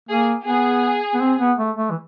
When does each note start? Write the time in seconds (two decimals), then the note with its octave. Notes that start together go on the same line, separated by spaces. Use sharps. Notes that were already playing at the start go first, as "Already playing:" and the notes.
0.09 A#3 G#4
0.46 B3 G#4
1.14 B3
1.21 C4
1.40 B3
1.59 A3
1.77 A3
1.91 E3